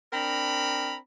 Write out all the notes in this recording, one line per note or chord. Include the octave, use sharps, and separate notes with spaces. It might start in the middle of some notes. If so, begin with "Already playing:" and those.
C4 D4 A#4 A#5 B5